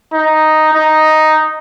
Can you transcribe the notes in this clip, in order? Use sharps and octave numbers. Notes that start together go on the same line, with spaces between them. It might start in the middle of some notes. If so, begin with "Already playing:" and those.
D#4
D#4